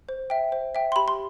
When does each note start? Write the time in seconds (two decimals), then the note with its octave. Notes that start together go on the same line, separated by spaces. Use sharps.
0.09 C5
0.30 E5 G5
0.52 C5
0.75 E5 G5
0.92 C6
0.96 G4 B5
1.08 C6